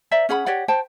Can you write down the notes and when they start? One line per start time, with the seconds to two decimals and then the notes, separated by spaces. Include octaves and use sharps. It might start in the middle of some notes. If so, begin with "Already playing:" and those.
0.11 C5 D5 E5 A#5
0.29 C#4 G#4 F#5 B5
0.46 G4 C#5 D5 F#5
0.68 C5 G5 A5